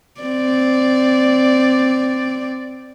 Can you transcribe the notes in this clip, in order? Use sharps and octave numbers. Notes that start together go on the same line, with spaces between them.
C4 D5